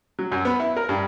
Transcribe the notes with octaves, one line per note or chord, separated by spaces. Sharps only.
F#3
F#2
B3
E4
A#4
G2